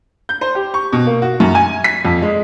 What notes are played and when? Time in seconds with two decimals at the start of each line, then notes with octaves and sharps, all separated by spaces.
0.29 G6
0.41 C5
0.55 G4
0.74 C#6
0.93 B2
1.06 A#3
1.22 F#4
1.40 F#2
1.55 G#5
1.84 B6
2.05 F2
2.22 G#3